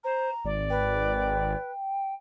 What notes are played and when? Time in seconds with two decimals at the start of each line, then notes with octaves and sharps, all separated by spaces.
0.04 C5 A#5
0.45 G#1 D5
0.70 B4 G5